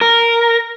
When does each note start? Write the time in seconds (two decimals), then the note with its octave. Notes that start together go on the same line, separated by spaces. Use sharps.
0.01 A#4